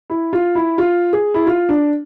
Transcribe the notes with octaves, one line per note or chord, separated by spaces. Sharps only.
E4
F4
E4
F4
G#4
E4
F4
D4